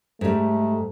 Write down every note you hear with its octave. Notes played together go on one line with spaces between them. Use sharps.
G#2 G3 A3